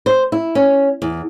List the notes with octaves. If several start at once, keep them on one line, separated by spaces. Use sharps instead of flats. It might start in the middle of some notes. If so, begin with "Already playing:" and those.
C5
E4
C#4
E2